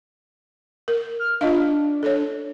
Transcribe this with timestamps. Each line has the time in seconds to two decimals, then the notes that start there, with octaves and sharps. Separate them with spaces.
0.88 A#4
1.19 F6
1.41 D4 F4 D#5 F5
2.03 A4 C#5